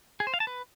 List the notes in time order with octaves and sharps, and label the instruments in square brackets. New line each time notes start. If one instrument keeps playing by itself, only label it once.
[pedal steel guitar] G#4
C5
F5
A5
B4